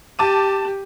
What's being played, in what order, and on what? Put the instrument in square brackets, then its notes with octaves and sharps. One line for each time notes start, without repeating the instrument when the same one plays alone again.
[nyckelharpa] G4 [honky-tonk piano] A5 D6 D#7